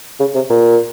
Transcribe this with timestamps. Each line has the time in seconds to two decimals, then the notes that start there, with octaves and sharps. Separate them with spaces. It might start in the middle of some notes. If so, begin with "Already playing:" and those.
0.20 C#3
0.35 C3
0.50 A#2